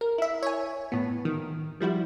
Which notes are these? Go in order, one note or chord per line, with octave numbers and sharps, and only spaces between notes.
A#4
E4 E5
C#5 G#5
A2 B3
D#3
F3 G3 E4 F#4